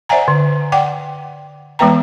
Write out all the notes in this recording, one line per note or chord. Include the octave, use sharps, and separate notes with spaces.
C5 D5 E5 F#5 G#5 A#5
D3
D5 F#5 G5 D6
E3 G#3 B3 B4 G5 A#5